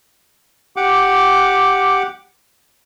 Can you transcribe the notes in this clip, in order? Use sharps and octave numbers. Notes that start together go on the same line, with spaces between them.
G4 F#5 D6